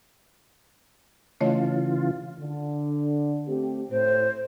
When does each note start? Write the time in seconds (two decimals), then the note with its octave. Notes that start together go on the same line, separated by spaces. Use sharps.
1.41 C#3 E3 A3 F4 C#5 D#5
2.40 D3
3.48 A3 C4 G4
3.91 A2 C5